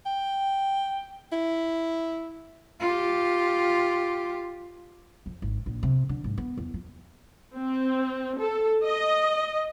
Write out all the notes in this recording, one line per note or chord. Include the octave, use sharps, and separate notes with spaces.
G5
E4
F4 G4
F2
G#1
A#1
C3
D3
G#2
B3
E2
F3
C4
A4
D#5